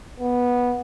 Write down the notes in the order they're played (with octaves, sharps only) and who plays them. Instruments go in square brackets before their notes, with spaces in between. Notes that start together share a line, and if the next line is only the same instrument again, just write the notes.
[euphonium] B3